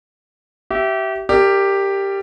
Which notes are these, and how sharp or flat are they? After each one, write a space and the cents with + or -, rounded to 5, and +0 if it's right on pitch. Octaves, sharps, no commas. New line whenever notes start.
G4 -30 E5 +0
G4 +5 A#4 -25 D5 +5